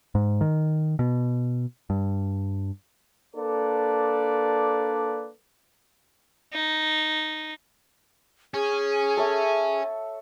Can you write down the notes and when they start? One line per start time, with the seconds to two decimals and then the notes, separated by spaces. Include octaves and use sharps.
0.15 G#2
0.41 D#3
0.99 B2
1.90 G2
3.35 A#3 D4 A4 B4 D5
6.54 D#4
8.54 C#4 G#4
9.17 A4 C#5 E5